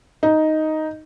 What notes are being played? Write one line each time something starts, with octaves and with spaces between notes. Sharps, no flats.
D#4